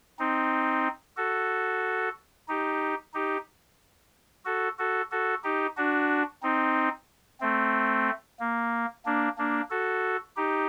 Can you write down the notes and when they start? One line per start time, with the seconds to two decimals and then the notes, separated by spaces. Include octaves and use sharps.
0.19 C4 D#4
1.17 F#4 A4
2.48 D#4 G4
3.14 D#4 G4
4.45 F#4 A4
4.78 F#4 A4
5.11 F#4 A4
5.44 D#4 G4
5.77 D4 F#4
6.43 C4 D#4
7.41 A3 C4
8.40 A#3
9.06 A#3 D4
9.38 A#3 D4
9.71 F#4 A4
10.37 D#4 G4